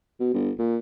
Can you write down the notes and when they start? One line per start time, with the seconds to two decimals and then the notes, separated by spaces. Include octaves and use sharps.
0.20 B2
0.34 G1
0.59 A#2